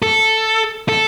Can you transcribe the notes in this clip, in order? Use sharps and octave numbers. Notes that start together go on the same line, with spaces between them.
A4
A4